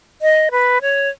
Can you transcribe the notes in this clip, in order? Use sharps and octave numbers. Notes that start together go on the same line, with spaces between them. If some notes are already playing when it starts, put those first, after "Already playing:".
D#5
B4
C#5